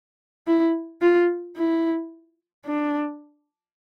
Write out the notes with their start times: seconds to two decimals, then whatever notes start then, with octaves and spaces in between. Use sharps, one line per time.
0.47 E4
1.01 F4
1.57 E4
2.65 D4